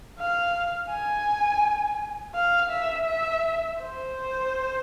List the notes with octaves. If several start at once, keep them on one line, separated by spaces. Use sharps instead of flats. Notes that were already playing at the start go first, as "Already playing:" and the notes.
F5
G#5
F5
E5
E5
C5